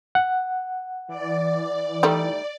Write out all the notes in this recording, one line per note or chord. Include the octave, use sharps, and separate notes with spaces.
F#5
E3 D5
D#3 G3 A3